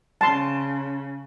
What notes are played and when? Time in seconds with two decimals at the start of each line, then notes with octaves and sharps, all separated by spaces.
0.21 C#3 A5 C6